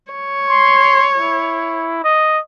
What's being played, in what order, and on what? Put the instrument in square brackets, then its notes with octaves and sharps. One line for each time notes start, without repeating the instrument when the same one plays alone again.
[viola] C#5
[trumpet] C6
E4
D#5